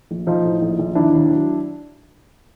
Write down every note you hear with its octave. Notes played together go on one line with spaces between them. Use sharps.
A#1
F3 D#4 F4
A2
A#1
A#1
D#3 D4 E4
D#2
F#3